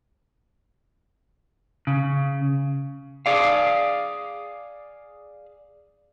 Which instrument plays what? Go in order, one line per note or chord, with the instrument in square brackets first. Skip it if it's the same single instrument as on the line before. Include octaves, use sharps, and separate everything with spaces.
[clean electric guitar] C#3
[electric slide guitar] G#4 D5 F5